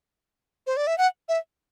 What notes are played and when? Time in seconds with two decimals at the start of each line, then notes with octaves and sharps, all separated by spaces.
0.67 C5
0.77 D5
0.87 E5
0.98 F#5
1.29 E5